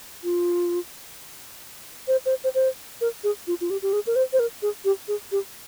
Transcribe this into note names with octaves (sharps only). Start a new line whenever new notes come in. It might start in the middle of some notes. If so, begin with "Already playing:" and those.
F4
C5
C5
C5
C5
A#4
G#4
F4
F4
G4
G4
G#4
A#4
C5
C5
A#4
G#4
G4
G#4
G4